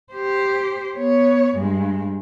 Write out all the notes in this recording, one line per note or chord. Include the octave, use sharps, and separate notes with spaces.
G4 C5
B3 C#5
G2 G#3